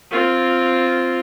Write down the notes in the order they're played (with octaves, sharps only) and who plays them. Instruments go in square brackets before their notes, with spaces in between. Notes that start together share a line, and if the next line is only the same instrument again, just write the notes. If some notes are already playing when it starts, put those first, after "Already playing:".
[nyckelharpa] C4 F4